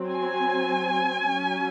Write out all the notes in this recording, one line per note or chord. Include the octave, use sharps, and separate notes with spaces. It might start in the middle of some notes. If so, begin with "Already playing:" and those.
Already playing: F#3 C4
G#5
F#3 C#4